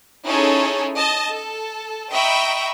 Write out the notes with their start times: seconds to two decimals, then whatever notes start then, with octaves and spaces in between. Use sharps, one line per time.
0.25 C#4 D#4 E4 G#4 A4 C#5
0.97 D#5 A5
1.30 A4
2.11 D#5 E5 G5 A#5 B5 C#6